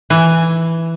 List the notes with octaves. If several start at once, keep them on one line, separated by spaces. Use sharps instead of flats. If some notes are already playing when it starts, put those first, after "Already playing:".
E3 G#5